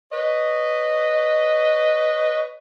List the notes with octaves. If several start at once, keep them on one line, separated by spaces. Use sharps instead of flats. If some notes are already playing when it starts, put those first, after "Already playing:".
B4 C#5 D#5